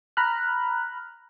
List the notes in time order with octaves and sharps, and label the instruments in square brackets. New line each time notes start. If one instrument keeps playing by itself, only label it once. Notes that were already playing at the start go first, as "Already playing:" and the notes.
[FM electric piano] A#5 B5 F6 F#6